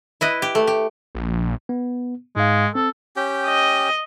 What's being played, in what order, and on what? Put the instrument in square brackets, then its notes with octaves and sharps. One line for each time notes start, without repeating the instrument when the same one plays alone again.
[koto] E4 B4 D#5
G4
A3
G4
[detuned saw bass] A#1
[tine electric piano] B3
[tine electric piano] G#2 F5 [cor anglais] G#3
[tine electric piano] C4 [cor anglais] A4
[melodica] C#4 G4 G5
[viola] D#5